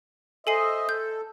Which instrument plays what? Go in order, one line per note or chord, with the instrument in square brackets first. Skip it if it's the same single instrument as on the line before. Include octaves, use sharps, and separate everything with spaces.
[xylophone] A4 G#5 C7 [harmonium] C5 D#5 E5
[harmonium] A4 [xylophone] G6